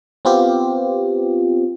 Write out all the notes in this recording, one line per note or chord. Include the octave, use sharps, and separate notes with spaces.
B3 C4 F4 G4